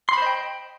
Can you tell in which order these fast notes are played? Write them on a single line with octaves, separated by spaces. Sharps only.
C6 B5 C5 D#5 G5